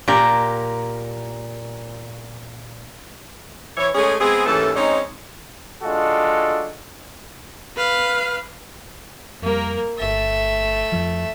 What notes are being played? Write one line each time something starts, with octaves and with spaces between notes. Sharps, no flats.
A#2 G4 A#4 A#5
E3 C#5
G#3 A3 C#4 G#4
G#3 B3 C4 G#4
D#2 G#2 E3 A3 C#4 A4
G#3 C4 C#4 D#4
G#3 D4 F4 F#4 A4
B4 F5
F2 G3 A#3 A#4
G1 A3 E5 A6
F2 F3